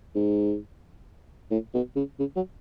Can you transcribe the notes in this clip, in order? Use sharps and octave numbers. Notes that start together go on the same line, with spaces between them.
G#2
A2
B2
C#3
C#3
F#3